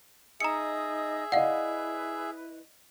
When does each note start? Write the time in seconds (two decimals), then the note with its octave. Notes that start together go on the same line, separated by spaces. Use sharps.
0.40 D#4 G#4 D#5 E5 A#5 D#6 C#7
1.32 E4 B4 D5 D#5 F5 F#5